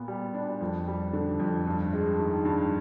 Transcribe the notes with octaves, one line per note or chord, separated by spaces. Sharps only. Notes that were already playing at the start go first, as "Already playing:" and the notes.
Already playing: A#2 B3
G3
D4
F2
G3
D3
F2
G2
G#3
D#3
G2